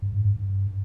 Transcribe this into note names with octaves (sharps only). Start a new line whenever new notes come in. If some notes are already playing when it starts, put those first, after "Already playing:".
G2
G#2
G2
G2